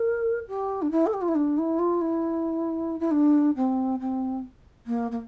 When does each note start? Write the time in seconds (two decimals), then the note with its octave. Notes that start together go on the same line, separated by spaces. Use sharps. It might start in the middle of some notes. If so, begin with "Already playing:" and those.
Already playing: A#4
0.47 G4
0.82 D4
0.91 E4
1.06 A4
1.13 G4
1.21 F4
1.28 E4
1.35 D4
1.58 E4
1.78 F4
2.01 E4
3.00 E4
3.11 D4
3.55 C4
3.99 C4
4.86 A#3
5.11 A#3